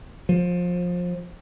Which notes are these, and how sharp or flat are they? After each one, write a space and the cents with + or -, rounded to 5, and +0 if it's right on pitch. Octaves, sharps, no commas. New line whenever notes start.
F3 +25